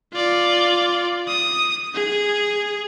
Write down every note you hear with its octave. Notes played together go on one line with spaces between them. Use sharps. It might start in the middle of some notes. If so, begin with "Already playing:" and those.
F4 D5
D#6
G#4